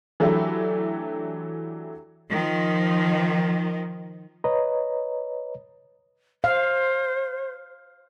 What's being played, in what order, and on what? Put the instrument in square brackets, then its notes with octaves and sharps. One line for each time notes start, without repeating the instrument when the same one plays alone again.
[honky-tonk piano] E3 F#3 A3 D4 E4 G4
[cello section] D#3 F3
[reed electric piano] B4 C#5 D#5 A#5
[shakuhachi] C5 [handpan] F5